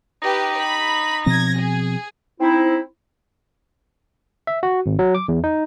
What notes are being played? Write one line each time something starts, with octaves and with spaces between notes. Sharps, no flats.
D#4 G4 B4
B5
B2 F3 C4 G#6 A#6
G#4
C4 D#4 E4
E5
F#4
G#1
F#3
D6
E2
D#4